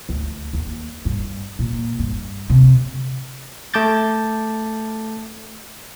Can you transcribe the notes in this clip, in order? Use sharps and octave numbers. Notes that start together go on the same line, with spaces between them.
D2
D#2
G2
A#2
G2
C3
A3 A5 D6 G6 A6